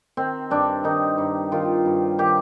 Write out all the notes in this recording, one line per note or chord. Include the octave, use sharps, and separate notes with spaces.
D#3 C4
G2 D4
D#3 D#4
G2
D#3 F4
G2
D#3 G4